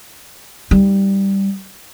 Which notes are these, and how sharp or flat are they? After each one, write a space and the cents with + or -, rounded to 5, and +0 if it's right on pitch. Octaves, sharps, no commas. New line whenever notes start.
G3 +0 D#4 +0